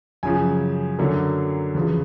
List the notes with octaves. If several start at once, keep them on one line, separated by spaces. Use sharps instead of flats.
F#2 C#3 F3 G#5
F#2 D3 F#3 A#3
E2 C#3 F3